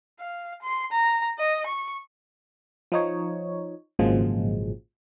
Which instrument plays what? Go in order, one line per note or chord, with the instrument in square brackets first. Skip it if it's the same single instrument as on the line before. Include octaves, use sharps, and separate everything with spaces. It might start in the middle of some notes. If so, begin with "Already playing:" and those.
[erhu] F5
C6
A#5
D#5
C#6
[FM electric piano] F3 D#4 C#5
G#1 A#2 C#3 F3 F#3 G#3